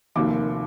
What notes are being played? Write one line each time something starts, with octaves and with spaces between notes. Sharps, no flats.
F1 D#2 D#3 D6